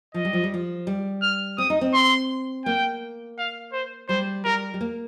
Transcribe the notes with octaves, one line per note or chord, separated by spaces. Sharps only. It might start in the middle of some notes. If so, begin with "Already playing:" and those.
F3 D#5
G3
F3
G3
F3
G3
F6
C4 D#6
D#4
C4
C6
A#3 G5
F5
C5
G3 C5
G3 A#4
G3
A#3